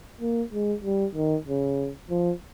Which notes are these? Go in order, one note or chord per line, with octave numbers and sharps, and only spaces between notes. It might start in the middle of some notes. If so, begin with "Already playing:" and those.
A#3
G#3
G3
D#3
C#3
F3